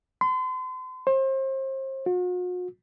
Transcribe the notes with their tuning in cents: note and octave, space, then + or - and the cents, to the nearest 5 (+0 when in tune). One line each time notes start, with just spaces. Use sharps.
C6 -40
C5 +35
F#4 -45